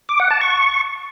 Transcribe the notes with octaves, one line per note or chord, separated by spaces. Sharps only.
D6
F#5
A5
C#6